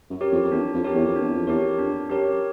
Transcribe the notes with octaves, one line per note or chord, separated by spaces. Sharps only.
F#2
G4 A#4 C#5
F2
F2
E2 D4
F2
G4 A#4 C#5
E2
F2
D4
E2
F2
E2 G4 A#4 C#5
F2 D4
F#2 G4 A#4 C#5